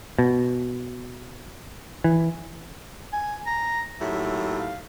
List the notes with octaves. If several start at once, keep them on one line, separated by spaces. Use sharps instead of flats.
B2
E3
G#5
A#5
D#2 A2 F#3 E5
F5